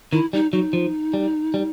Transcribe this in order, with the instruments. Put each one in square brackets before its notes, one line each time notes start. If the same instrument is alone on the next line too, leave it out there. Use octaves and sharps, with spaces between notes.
[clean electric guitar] D#3 [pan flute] E4
[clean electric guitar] G3 [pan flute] D#4
[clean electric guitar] F#3 [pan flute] D#4
[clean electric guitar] F3
G3
G3